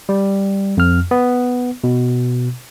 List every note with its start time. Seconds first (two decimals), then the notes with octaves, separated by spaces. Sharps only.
0.09 G3
0.77 F2 F6
1.11 B3
1.84 B2